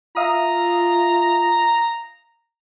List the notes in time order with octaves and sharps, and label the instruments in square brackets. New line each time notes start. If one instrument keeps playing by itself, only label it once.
[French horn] F4 [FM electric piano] E5 F5 D#6 [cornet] A#5